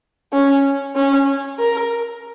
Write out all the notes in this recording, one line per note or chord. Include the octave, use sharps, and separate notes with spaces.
C#4
C#4
A#4